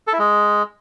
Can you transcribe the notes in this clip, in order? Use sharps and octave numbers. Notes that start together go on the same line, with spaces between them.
A4
E4
G#3